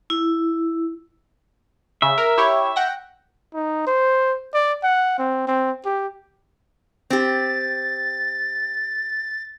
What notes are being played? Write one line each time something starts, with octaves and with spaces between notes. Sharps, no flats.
E4
C#3 E5
A#4
E4 G4 C#5
F#5 G5 A#6
D#4
C5
D5
F#5
C4
C4
G4
C4 G4 A6